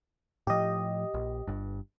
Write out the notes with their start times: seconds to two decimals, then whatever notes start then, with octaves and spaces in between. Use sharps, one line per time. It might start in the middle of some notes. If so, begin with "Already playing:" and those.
0.47 A2 F3 G4 D#5
1.14 A#1
1.47 G1 G2